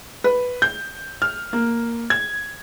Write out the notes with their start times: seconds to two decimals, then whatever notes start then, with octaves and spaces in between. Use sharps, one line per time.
0.24 B4
0.62 G6
1.22 F6
1.53 A#3
2.10 G#6